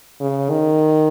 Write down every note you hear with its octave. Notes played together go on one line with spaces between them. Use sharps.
C#3
D#3